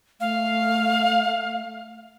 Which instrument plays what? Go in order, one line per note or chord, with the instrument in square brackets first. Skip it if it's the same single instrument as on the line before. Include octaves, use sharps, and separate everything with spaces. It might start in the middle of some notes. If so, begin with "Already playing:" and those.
[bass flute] A3 [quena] F5